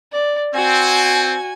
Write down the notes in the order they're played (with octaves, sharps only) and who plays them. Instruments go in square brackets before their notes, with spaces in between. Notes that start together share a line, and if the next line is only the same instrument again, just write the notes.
[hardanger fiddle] D5
[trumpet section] C4 [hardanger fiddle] F#4 [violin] G#5